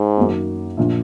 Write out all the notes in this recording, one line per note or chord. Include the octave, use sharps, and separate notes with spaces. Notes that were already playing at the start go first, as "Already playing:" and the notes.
Already playing: G#2
F#2 D#3 F#3 A#3 D#4
A#1 A#2 F3